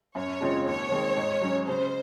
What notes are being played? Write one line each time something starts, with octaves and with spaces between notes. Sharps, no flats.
F#2 C#5
C#3 G#3 C4 F4
D#2 C#5
D#3 G#3 C4
G#2
F#3 C#4
C#3 C5